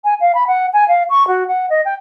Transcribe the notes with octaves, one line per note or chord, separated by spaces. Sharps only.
G#5
F5
B5
F#5
G#5
F5
C#6
F#4
F#5
D#5
G5